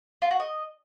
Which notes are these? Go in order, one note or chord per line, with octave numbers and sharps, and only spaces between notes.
F4
F#4
D#5